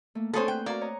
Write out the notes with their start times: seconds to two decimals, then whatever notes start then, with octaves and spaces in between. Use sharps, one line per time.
0.15 A3 A#3
0.33 D3 A3 C4 G#4 A4 C5 C#5
0.48 C4 B4 G5 F#6
0.66 A#3 F#4 A#4 D5
0.81 C#5 D#5 A#5